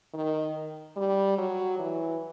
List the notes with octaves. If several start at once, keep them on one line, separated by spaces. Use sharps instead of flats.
D#3
G3
F#3
E3